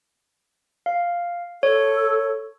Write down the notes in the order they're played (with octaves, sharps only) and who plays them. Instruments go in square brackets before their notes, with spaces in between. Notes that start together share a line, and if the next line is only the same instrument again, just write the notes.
[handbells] F5
[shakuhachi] A4 [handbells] C#5